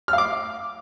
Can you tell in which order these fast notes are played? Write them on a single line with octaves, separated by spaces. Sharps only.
F6 F5 D6